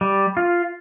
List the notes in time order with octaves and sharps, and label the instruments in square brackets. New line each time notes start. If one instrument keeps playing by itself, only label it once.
[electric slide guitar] G3
F4